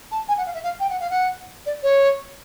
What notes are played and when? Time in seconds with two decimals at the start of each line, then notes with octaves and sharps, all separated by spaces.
0.11 A5
0.28 G#5
0.37 F#5
0.46 F5
0.54 E5
0.63 F5
0.80 G5
0.89 F#5
1.00 F5
1.10 F#5
1.66 D5
1.83 C#5